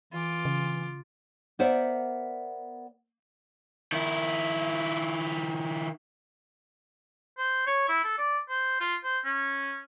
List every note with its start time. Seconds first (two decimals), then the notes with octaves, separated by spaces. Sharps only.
0.13 E3 F4 D6
0.45 C#3
1.59 B3 A#4 C5 D5 E5 F#5
3.92 D#3 E4
7.38 C5
7.67 C#5
7.88 E4
8.04 A4
8.18 D5
8.49 C5
8.80 F4
9.03 C5
9.25 C#4